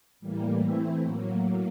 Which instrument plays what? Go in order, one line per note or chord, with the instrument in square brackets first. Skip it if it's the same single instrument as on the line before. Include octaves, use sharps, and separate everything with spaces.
[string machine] A2 E3 G3 A#3
E3 A3 C4 E4
A2 F#3 A#3